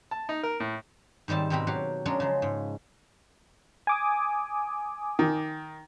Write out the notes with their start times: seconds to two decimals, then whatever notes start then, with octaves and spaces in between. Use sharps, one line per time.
0.11 A5
0.29 D#4
0.43 A#4
0.60 A2
1.28 G#2 D#3 G3 C4 A5
1.50 G#2 B2 C4 G4 A#5 B5
1.67 F#3 F#4 G4 F5
2.05 F#3 G#3 C#4 D4 A#4
2.20 C#3 F3
2.42 G#2
3.87 G#5 D6 D#6
5.19 D#3